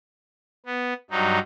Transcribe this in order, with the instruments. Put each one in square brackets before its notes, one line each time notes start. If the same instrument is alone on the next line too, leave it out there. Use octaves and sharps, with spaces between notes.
[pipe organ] B3
G2 F#3 D#4